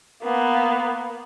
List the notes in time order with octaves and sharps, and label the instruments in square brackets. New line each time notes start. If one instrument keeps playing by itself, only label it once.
[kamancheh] A#3 B3